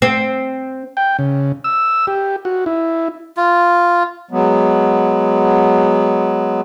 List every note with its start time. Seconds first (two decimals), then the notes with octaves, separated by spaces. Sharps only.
0.02 C4
0.97 G5
1.19 C#3
1.64 E6
2.07 G4
2.45 F#4
2.66 E4
3.37 F4
4.31 F#3 G#3 B3